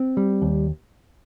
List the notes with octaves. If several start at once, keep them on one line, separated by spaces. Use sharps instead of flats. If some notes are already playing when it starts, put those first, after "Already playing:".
Already playing: C4
G3
D#2